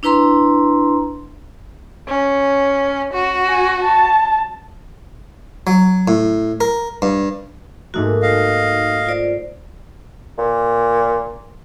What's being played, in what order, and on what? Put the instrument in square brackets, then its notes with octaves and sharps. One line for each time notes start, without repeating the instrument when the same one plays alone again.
[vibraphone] D4 E4 B4 A#5 C6
[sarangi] C#4
F#4
[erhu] G#5
A5
[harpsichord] F#3
A2
A#4
G2
[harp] G#2 A3 A#3 [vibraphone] D#4 F#4
[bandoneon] D#5 F5
[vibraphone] F4 C5 D5
[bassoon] A#2